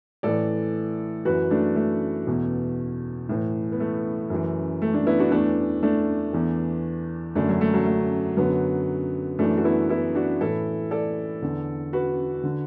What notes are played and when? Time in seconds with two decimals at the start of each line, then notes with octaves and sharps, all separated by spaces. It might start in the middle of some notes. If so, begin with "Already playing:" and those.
0.23 A2 E3 A4 D5
1.25 F#2 E3 F#4 B4
1.51 A3 D4
1.76 A3
2.27 E2 B2
3.29 A2 E3
3.72 B3
3.80 A3
4.30 F#2 E3
4.82 A3
4.94 A3 D4
5.07 B3 E4
5.19 D4 F#4
5.32 E2 E3 A3 D4
5.83 A3 D4
6.33 E2 E3
7.35 F#2 D3 A3 D4
7.49 F#3
7.61 A3
7.74 F#3
7.86 A3
8.37 F#2 D3 F#3 B3
9.39 F#2 E3 A3 D4
9.57 F#4
9.65 B3 E4
9.89 B3 E4
10.15 D4 F#4
10.41 A2 E3 E4 A4
10.91 A4 D5
11.42 E2 D3
11.93 F#4 B4
12.43 D3